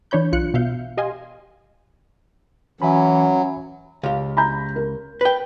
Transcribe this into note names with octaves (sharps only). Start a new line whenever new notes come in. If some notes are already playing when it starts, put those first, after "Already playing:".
E3 D4 C#5 B5 G6
B1 F4 F#6 C#7
B2 E5 F5 G6
G4 D#5 F5 G#5 C6
E3 F#3 C#4 E5 G#5 B5
C#2 G4 F5
A#5 B5 G6
A#4
B4 G5